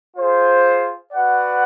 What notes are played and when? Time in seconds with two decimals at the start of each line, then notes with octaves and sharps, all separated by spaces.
0.16 F4 G#4 C5
1.13 F#4 B4 D5 F#5